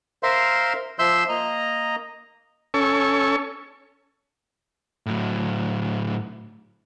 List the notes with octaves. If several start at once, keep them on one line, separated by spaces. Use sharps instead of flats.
A#4 C5 E5 F5 C6
F3 E5 C6 E6 G6
A#3 D#5 A#5
C#4 A4 C#6
A2 F#3